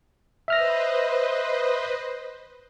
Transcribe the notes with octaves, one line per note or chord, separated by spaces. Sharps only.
B4 C5 D#5 E5 F6 A#6